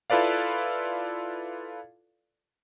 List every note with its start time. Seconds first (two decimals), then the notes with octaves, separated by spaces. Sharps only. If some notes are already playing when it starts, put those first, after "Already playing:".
0.10 E4 F4 A4 B4 D5 F5